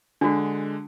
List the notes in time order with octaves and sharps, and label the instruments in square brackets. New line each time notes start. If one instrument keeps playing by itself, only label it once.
[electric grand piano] D3 G#3 [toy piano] D4 F#4